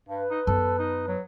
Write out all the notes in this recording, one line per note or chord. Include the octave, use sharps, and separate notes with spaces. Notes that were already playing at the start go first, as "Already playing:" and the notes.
G2 B4
D#4
F#2 B3 A4
D#4
F#3